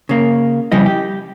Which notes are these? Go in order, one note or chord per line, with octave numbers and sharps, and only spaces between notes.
C#3 A#3
F2 C#3 G3 E4 D#5
G4